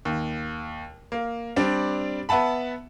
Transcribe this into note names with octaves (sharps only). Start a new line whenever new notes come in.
D#2
A#3
G3 C4 D4
B3 E5 F#5 A5 B5